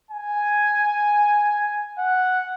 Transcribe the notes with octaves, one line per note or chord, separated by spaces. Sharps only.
G#5
F#5